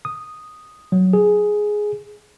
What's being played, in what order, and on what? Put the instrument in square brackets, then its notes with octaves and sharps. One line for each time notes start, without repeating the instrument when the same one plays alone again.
[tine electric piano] D#6
F#3
G#4